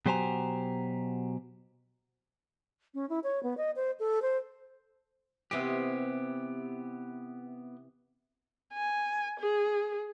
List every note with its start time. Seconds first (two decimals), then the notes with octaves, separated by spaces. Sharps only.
0.06 B2 F#3 G4 C5 G#5 A#5
2.94 C#4
3.09 E4
3.24 C#5
3.43 B3
3.57 D#5
3.76 C5
4.00 A4
4.22 C5
5.51 C3 E3 B3 E4 G4 D#5
8.73 G#5
9.40 G#4